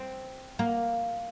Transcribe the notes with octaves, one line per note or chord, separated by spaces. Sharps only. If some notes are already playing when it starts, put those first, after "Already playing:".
Already playing: C4
A#3